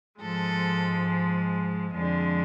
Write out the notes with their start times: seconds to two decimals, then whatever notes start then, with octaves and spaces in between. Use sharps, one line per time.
0.20 G#2 F3 G#3 A4
1.94 F2 D3 F3 G#3